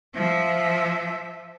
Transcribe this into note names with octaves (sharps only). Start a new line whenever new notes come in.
F3 E5